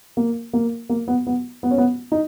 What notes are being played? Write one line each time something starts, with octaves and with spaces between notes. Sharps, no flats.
A#3
A#3
A#3
B3
B3
B3
C#4
B3
D#4